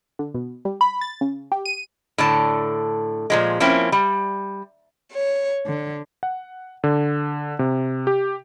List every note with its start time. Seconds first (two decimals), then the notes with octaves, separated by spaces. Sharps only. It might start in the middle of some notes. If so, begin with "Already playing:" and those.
0.19 D3
0.35 B2
0.65 G3
0.81 B5
1.01 A6
1.21 C#3
1.52 G4
1.66 D#7
2.18 A2 D3 A5
3.30 A#2 F3 G#3
3.60 F3 A#3 C4 C#4 E4
3.92 G3
5.13 C#5
5.67 D3
6.23 F#5
6.84 D3
7.59 C3
8.07 G4